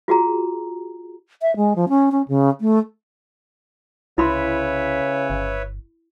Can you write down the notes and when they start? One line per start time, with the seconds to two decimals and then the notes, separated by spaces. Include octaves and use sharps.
0.08 F4 F#4 G#4 A#5
1.42 E5
1.56 G#3
1.76 F3
1.89 C#4
2.12 C#4
2.28 C#3
2.61 A3
4.18 C2 C#3 E4 B4 C#5 E5 B5 C6
5.30 G1